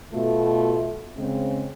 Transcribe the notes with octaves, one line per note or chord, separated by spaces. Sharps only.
B2 A3 F4
C#3 G#3 C4